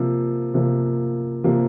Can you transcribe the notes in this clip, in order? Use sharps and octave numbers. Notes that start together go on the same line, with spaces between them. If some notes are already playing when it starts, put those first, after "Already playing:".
Already playing: C3 F3 A#3
C3 F3 A#3
C3 F3 A#3